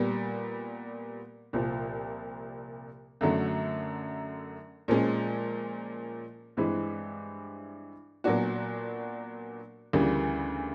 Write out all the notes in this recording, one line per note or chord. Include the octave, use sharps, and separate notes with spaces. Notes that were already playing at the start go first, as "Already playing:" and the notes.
Already playing: A#2 G3 B3
C2 A#2 F3 A#3
F#2 D3 F#3 A3
A#2 F3 G#3 C#4
G2 E3 G#3 C4 E4
A#2 F#3 B3 D4 F#4
D2 C#3 E3 G3 A#3